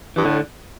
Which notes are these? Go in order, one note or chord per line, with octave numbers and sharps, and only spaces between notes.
G2 E3
A2 D3